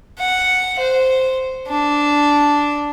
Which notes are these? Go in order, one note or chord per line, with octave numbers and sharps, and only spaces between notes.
F#5
C5
D4